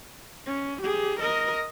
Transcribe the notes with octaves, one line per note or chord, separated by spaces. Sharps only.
C#4
G4 G#4
A#4 D#5